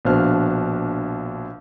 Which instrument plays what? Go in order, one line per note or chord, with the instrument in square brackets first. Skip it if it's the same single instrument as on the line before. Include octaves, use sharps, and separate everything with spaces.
[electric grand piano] A#1 B2 D4 C5 F5 F6